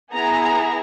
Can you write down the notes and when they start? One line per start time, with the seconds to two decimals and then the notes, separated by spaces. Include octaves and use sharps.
0.13 B3 E4 G#4 A#5